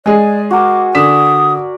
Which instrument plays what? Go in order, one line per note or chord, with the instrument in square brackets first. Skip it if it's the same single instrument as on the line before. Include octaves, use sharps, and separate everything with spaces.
[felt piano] G#3 G#4 [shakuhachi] D5 [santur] G#5
[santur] F#4 A#4 [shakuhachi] D6
[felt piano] D3 B6 E7 [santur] D5 [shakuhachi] D#6